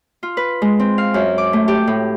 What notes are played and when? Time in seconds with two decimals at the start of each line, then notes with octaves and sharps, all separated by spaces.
0.23 F4
0.37 B4
0.62 G#3
0.79 C4
0.98 F5
1.14 F#2
1.38 D6
1.53 A3
1.68 G4
1.87 A2